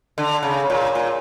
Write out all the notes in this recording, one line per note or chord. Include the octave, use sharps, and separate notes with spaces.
D3
C#3
A#2
A#2